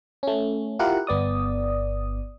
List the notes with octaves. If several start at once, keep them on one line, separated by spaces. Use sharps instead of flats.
A3 C#4
E4 F4 G4 A#4 F#5
G1 B3 D5 D#6